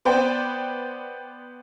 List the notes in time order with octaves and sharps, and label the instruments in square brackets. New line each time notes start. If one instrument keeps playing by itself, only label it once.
[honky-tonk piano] B3 B4 C5 D5 G5